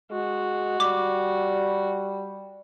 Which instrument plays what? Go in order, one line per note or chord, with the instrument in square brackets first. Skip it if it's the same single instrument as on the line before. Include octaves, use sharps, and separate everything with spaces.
[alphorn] G#3 [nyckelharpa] F#4
[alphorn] G3 [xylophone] D6